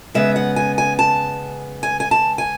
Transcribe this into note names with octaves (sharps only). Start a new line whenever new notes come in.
C#3 G#3 B3 E5
F#5
G#5
G#5
A5
G#5
G#5
A5
G#5